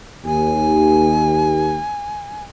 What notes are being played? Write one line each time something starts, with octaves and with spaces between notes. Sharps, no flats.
D#2 G#5